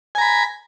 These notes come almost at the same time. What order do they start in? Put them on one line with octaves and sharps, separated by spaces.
G#5 A#5 B5